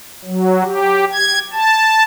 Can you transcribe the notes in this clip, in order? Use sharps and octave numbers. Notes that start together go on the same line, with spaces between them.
F#3
G4
G#6
A5